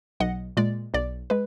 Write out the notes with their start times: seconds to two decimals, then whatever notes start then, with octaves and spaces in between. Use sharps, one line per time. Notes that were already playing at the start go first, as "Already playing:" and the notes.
0.20 B1 D#5 F#5
0.57 A#2 G#3 D5
0.94 B1 D5
1.30 G#3 B4